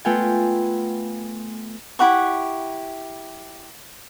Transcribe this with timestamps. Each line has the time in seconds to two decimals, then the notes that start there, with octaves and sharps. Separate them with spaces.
0.05 A3 B3 F4 G5 G#5
1.99 E4 G4 F#5 C#6